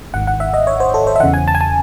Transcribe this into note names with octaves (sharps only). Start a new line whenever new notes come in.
G#1 G#2 D#3 F#5
F#5
E5
D#5
C#5
C5
A4
C5
E5
E2 C#3 E3 F#5
G#5
A5
G#5
A5